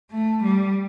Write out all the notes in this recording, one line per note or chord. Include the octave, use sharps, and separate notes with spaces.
A3
G3